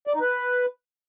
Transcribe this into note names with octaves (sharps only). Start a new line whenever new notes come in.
D5
D#4
B4